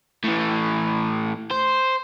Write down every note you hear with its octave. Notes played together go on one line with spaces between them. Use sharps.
A2 E3
C5